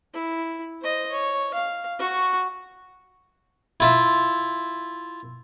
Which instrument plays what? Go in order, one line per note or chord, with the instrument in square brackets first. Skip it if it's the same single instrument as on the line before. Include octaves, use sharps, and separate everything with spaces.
[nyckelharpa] E4
C5 D#5
C#5
F5
F#4 C#6
[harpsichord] E4 F4 E5